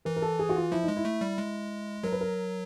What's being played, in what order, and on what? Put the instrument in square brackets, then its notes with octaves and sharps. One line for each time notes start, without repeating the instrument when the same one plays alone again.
[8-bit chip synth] E3 [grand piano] A#4
[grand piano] A#4
A4
G#4
F#4
F4
[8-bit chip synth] F3 [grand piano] E4
[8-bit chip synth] G#3 [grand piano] D#4
[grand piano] E4
[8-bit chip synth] A3
G3
G#3
[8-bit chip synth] F#3 [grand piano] A#4
[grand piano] B4
A#4